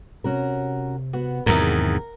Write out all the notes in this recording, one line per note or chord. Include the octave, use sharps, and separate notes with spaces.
C3 C#4 F#4 A#4
B3 F#4
E2 G#2 C3 D#3 F#3 A#4 F#5 A#5